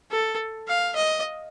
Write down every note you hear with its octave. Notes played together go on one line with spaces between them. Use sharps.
A4
F5
D#5